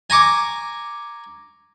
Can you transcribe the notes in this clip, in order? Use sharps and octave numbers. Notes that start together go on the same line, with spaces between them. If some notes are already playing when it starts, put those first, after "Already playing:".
G#5 A#5 C#6 D6